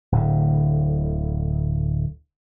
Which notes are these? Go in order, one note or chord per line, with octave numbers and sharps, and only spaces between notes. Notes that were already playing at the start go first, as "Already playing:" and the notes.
D1 A2 D3